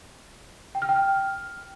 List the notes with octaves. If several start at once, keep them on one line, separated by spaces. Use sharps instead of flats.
G5
F6
G5
F6